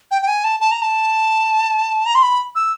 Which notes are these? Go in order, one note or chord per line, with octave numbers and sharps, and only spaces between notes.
G5
G5
G#5
A5
A5
A#5
A5
A#5
C6
B5
E6